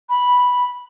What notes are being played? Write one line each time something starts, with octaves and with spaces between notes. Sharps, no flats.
B5